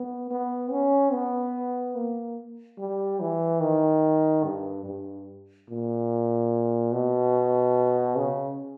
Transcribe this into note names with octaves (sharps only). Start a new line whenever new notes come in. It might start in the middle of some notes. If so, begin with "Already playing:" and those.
Already playing: B3
B3
C#4
B3
A#3
G3
E3
D#3
G2
G2
A#2
B2
C#3